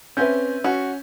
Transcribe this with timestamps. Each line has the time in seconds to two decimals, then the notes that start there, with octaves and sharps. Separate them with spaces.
0.17 C4 C#4 B4 E5 G6
0.64 C#4 F#4